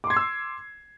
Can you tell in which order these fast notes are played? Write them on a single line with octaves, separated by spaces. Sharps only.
D6 C6 G#6 C7 E6